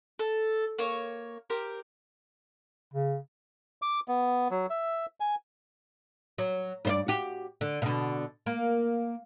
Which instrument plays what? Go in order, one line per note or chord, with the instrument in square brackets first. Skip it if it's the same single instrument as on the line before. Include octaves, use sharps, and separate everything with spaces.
[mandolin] A4
A#3 C#5
G4 A#4 C5
[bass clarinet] C#3
[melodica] D6
B3
F#3
E5
G#5
[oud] F#3
G2 C5 D5
F#4 G4
D3
B2 D3
A#3